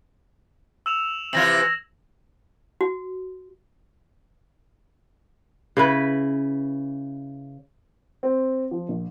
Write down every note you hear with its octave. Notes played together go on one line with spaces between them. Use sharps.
E6 E7 F7
C3 E3 F4 G#6 A#6 F#7
F#4
C#3 E4 B4
C4
F3
A#1